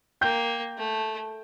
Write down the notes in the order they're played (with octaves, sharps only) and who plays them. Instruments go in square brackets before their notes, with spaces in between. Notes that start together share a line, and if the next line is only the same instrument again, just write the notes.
[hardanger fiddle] A#3 [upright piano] G5 G6
[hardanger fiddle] A3